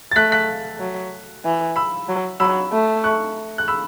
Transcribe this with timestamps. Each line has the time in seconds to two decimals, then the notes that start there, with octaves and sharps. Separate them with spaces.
0.12 A6
0.16 A3 F#6 B6
0.32 F#6 B6
0.80 F#3
1.45 E3
1.76 B5 E6
2.09 F#3
2.40 F#3 B5 E6
2.72 A3
3.04 C#6 F#6
3.58 F#6
3.68 B5 E6